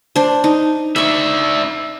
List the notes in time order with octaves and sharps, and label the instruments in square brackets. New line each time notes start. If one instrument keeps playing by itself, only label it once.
[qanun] D4 C5
D#4
[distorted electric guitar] D4 E5 [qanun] B5 C#6